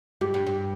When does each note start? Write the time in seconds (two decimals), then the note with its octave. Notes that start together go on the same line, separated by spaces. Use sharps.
0.21 G2 G4
0.34 G2
0.47 G2